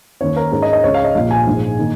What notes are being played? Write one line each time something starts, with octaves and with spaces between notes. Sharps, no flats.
D#2 D#3 C#4 C#5
A#4
G#2 G#3 C#4 A#4
D#5
D#5
C#2 C#3 G#3 C#5
F5
D#5
A#1 A#2 A#3 F5
G#5
A#1 G#2 G#3
D#3 A#3